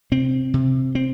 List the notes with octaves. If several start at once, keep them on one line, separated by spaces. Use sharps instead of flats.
C3 C4
C3
C4